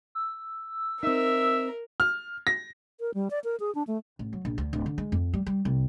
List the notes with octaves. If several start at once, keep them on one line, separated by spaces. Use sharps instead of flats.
E6
C4 D#4 A#4 E5
F6
A#6
A#4
G3
D5
A#4
G#4
D4
A3
A1
F#3
A#1
D2
D1
D3
G#3
F2
G3
G3
C2